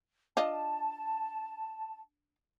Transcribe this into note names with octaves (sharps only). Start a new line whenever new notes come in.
D4 F4 D#5 A5